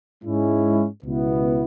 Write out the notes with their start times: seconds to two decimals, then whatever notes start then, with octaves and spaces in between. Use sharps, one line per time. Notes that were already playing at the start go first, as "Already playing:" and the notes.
0.24 G#2 G#3 C#4 E4
1.02 C#2 B2 B3 E4